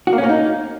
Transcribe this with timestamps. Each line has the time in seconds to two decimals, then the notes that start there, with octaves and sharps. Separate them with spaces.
0.07 F#4
0.13 A#3
0.18 C#4
0.24 A#3
0.29 D#4